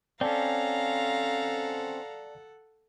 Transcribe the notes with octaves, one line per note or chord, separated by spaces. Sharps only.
C4 C#4 A4 D5 F5 F#5 A5 A#5